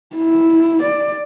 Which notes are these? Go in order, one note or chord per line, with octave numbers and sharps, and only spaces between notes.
E4
D5